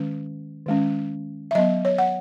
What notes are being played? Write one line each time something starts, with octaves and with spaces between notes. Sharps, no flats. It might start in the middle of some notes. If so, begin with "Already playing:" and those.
Already playing: D#3 G#3 C#4
D#3 G#3 C#4
E5
F#3 B3 D#5
C#5
F#5